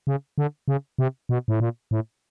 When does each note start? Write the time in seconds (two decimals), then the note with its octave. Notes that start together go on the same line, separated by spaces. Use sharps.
0.07 C#3
0.38 D3
0.68 C#3
0.98 C3
1.29 B2
1.48 A2
1.60 A#2
1.91 A2